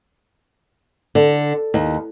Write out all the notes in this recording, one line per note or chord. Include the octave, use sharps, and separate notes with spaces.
D3
D#2